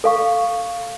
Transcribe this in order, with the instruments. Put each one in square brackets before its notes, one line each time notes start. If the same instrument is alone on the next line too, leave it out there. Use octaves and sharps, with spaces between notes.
[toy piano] A4 F5 C#6